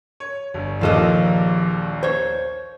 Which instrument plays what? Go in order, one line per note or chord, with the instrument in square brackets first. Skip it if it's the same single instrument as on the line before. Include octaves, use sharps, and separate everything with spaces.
[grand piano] C#5
G1
[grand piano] A#1 D#2 A#2 [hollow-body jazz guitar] F3 A4 D#5
[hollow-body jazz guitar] C5 C#5